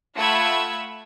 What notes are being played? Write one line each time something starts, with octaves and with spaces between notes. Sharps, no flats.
A3 F4 F#5 B5 E6 G#6